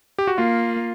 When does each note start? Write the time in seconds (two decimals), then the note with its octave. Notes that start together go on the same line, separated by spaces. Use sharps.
0.19 G4
0.27 F#4
0.37 A#3 F4